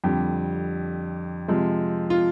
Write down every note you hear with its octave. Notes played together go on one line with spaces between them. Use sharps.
F2 D3 G3 G4
C3 F3 G#3
F4